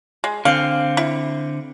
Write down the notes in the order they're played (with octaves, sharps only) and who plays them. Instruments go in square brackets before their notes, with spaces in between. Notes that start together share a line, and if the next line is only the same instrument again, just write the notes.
[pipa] G#3
[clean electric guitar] D3 C4 [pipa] F5
[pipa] E4